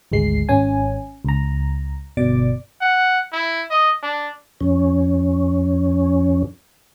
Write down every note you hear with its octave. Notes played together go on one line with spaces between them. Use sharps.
G#1 D2 G#3 C7
G#1 C#4 G#5
C#2 A#5
G1 B2 D5 D6
F#5
E4
D#5
D4
F2 C#4